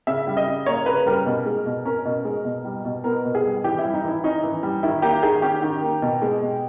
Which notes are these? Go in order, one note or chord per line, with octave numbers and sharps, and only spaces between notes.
C#3 E5
G3
D#5
C#3
A#3 C#5
C#3 B4
G3 A#4
B2
G#3
B2
C#4 A#4
B2
G#3
B2
G3
B2
B3 A#4
B2
G#4
G3
E3 G4
E4
G3
D#4
E3 E4
C#4 D#4
E3
G3
D#3 E4
A#3 G4
D#3 G#4
C#4 G4
D#3
A#3
B2
G#3
B2